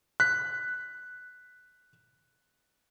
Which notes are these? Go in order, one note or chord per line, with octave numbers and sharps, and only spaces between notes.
F#6 B6